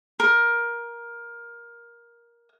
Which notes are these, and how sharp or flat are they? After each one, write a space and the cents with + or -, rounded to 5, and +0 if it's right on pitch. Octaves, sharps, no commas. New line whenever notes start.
A#4 +15